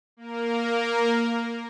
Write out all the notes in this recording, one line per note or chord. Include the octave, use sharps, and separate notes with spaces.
A#3 A#4